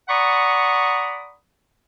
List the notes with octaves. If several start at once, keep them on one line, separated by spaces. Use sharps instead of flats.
D5 F#5 A#5 B5 C#6 D#6